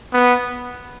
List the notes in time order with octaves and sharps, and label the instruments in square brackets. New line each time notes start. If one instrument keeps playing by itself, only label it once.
[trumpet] B3